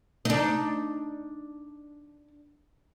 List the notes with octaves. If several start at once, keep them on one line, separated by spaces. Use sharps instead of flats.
D4 D#4